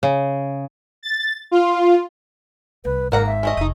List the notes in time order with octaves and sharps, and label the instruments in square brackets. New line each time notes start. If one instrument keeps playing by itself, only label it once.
[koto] C#3
[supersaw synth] A6
F4
[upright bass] C2 [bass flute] B4
[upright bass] G#1 [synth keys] G#2 [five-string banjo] A#3 F#5 A#5 [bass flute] A#4
[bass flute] E5
[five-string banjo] G#3 A3 D#5
[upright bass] F1 [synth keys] D#4 D#6